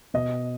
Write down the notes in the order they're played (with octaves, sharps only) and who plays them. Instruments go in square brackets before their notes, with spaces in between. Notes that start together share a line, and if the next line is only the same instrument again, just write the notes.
[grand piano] B2 D#5